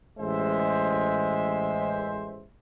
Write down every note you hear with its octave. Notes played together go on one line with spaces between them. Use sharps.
A1 G#3 C5 E5